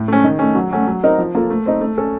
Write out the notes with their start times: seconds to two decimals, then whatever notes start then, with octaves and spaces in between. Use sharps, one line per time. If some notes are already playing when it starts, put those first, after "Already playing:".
Already playing: A2
0.08 A3 C#4
0.24 D#3
0.39 A3 C#4
0.55 F#3
0.71 A3 C#4 F#4
0.87 F#3
1.03 C4 D#4 A#4
1.18 F3
1.35 A#3 F4 A4
1.50 A3
1.66 C4 D#4
1.81 A3
1.98 C#4 A4